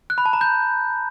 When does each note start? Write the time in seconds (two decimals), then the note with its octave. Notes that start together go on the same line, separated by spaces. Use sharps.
0.10 F#6
0.18 B5
0.26 A5
0.33 A#5
0.41 G6